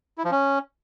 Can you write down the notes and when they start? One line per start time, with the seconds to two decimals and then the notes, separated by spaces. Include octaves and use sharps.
0.18 E4
0.25 F3
0.31 C#4